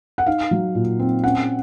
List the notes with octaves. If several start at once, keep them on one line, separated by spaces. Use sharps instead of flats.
F#5
D#4 F5
F#3
A#2
C4
C#4 F#5